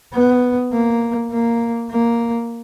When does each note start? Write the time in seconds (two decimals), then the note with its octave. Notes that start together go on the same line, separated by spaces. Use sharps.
0.13 B3
0.72 A#3
1.31 A#3
1.90 A#3